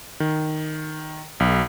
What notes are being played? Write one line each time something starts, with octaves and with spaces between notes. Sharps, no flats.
D#3
B1